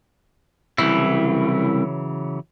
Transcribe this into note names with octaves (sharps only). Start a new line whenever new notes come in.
C2 C#3 E3 F#3 E4